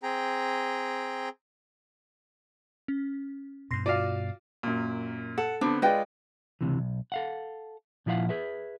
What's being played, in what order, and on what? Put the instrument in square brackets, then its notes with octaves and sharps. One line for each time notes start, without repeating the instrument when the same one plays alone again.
[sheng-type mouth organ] C4 G#4 G5 A#5
[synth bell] C#4
[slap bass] G2 B2 [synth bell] C6 A#6 C7
[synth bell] F4 F#4 [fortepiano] D5 F5
[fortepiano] F#2 A#2
[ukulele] A4 [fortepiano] F#5
[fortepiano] D3 B3 C4 [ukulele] D4
[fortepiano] G#3 F4 D5 [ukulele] B4 D#5 G5
[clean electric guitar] C#2 G#2 C3 E3
B1
A4 F5 F#5
A#2 F3 E4 A4 F5 F#5
G#4 B4 E5